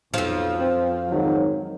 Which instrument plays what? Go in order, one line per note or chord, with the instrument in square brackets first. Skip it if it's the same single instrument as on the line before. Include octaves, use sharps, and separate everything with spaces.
[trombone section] B1 [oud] F2 F3
[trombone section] C4
G#2 D#3 F#3